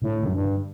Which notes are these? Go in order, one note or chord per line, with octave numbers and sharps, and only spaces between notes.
A2 D3
F#2 D3
G2
D3